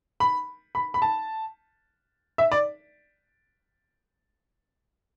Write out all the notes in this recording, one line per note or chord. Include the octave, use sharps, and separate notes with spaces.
B5
B5
B5
A5
E5
D5